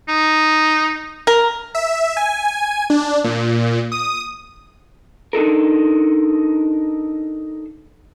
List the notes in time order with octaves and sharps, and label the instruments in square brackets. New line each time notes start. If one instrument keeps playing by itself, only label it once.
[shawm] D#4
[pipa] A#4
[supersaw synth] E5
G#5
D4
A#2
D#6
[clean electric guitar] D4 D#4 A4 A#4